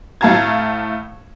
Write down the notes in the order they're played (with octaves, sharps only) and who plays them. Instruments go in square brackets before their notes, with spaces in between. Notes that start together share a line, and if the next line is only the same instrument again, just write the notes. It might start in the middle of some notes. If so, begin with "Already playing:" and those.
[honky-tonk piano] A2 A3 F5 A5 A#5 G#6